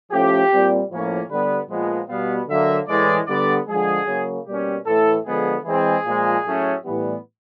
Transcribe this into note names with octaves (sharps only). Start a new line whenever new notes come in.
A2 F3 A3 C#4 G4
A#2 G3 C4
A2 F3 A#3 C#4
D3 G3 B3 B4
A#2 F3 G#3 B3
B2 G3 B3 F5
D3 F#3 A#3 E5
A2 E3 G#3 D5
D3 G3 B3 D5
D3 F3 G#3 G#4
C#3 F#3 A#3
B2 G3 A#3 C#4 G4
A2 E3 A3 A4
D3 F3 G#3 B3 G#4
E3 G#3 C4 G#4
A#2 F3 G#3
A2 F#3 A3 C#4
A2 E3 G3 B3